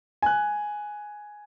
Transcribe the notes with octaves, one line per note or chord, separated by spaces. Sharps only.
G#5 F#6